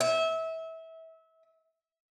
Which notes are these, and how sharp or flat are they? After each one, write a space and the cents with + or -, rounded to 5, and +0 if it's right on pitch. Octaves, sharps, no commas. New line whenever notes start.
E5 -25